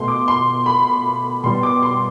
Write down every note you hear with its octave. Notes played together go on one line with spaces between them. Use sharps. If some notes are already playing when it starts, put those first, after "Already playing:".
Already playing: B2 A3 C6
D6
C6
B5
B2 G3 B3 C6
D6
C6